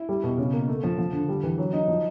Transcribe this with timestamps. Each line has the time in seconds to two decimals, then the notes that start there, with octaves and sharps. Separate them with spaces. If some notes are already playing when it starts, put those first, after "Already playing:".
Already playing: E4
0.09 G3
0.23 B2
0.38 C#3
0.53 A#3
0.68 A3
0.83 F3
0.98 F3
1.13 D3
1.28 G3
1.43 E3
1.58 F#3
1.73 D#4
1.88 F3